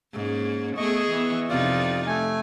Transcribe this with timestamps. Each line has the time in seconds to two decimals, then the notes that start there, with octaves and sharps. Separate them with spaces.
0.13 G#2 A#3 C#4
0.77 A3 B3 G#4 D#5 C#6
1.09 E3 B3
1.49 F2 C3 D#4 F4 D5
2.07 A3 G#5